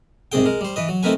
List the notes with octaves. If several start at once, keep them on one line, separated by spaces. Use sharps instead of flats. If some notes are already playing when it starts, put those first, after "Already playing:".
C2 G#2 C3 G#4 G5
G#3 A#4
G3 C5
E3 B4 D#5
F#3
A3 C4 D#4 A#4 B4 G#5